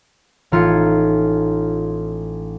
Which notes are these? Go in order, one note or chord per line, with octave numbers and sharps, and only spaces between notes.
A1 D#4 F4 A4 G#6 C#7